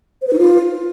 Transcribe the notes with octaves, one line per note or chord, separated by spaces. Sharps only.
C5
B4
D#4
F4